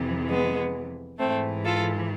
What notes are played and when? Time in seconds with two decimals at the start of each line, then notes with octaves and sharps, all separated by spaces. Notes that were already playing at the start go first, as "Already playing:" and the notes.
Already playing: F2 C3 E3
0.29 G#3 B3
1.18 G#2 E3 A3 C4
1.64 F4 A4